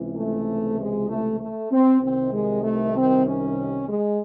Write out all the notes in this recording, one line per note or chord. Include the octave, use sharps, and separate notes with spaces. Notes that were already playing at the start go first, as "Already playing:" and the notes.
Already playing: C#2 C3 E3
A3
G#3
A3
A3
C4
C2 C3 D#3 C4
G#3
A3
C4
C#4
G#3